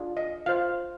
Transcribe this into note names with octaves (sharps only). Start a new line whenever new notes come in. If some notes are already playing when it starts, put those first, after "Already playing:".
Already playing: D4 F4 G#4
D#5
F4 C5 F5